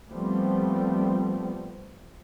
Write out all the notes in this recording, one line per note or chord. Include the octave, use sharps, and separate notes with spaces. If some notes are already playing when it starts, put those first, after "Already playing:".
F3 G3 A3 B3 C4